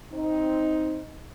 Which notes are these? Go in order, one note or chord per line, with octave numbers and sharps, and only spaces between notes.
C4 D#4